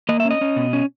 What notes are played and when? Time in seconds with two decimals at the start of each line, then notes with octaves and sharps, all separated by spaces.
0.09 A#3 D#5
0.20 E5
0.25 C#4
0.31 D#5
0.41 C#4
0.56 B2
0.73 C#4